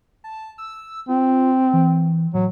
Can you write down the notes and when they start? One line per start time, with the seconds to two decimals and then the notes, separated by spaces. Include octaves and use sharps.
0.24 A5
0.58 E6
1.09 C4 F4
1.73 E3
2.34 A2 F#3